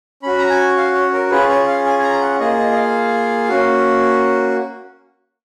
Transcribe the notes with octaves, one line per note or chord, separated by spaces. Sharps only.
C#4 F#4 B5
A#5
G#5
F5
C#5
A#4
C#4 F4 G#4 B4
C#5
F5
G#5
G#5
A#5
F#5
A#3 F4 G#4 D#5
D#5
D#5
F5
A#3 C#4 F#4